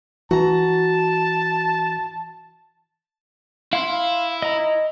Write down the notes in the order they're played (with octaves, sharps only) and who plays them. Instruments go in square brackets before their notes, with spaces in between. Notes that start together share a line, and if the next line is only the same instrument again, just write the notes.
[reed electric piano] E3 [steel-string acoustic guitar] F#4 A#5 [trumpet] A5
[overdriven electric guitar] E4 [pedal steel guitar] F5 C6
[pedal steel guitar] D#5 A#5